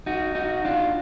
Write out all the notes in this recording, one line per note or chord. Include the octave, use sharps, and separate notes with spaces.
D#4 F#4
D#4 F#4
D4 F4